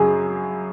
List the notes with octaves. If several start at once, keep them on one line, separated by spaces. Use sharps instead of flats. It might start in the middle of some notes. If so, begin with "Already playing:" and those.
Already playing: F#2 C#3 F#3 G#4